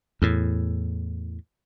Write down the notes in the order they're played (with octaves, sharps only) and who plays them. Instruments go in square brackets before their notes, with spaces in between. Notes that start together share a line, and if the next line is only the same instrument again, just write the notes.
[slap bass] E2 A2